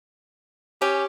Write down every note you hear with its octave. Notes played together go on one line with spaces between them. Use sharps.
C#4 G4